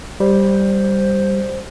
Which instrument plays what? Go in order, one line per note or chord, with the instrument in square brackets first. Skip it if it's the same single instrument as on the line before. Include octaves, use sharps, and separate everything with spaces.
[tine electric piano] G3 [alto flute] C5